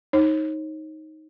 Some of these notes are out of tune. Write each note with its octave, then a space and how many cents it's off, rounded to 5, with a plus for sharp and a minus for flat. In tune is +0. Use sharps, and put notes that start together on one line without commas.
D#4 +10 C#5 -35